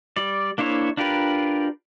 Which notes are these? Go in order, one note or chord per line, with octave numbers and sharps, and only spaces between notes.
G3 D5
A#3 D4 E4 C5 C#5
D4 F4 G4 A#4 B4